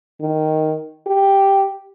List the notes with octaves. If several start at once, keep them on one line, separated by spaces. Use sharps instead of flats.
D#3
G4